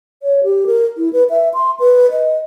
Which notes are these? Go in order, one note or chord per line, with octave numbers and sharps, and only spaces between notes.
C#5
G4
A#4
E4
B4
E5
C6
B4
D#5